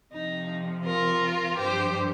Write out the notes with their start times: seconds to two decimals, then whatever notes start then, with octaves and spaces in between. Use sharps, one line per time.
0.13 F2 C3 F3 D#4
0.85 F4 A#4
1.57 G2 F3 G4 C5